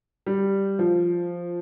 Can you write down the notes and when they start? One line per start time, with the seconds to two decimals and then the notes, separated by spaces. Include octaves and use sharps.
0.27 G3
0.79 F3